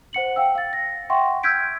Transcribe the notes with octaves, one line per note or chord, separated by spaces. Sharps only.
C5 F#5 C#7 F#7
F5 G5 E6
F5 A6
A#6
E5 F#5 G5 C6 C#6
E6 F6 G6 G#6 B6 D7